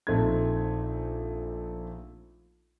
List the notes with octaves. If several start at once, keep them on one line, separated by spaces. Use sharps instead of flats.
A#1 A3 C4 D#4 G#6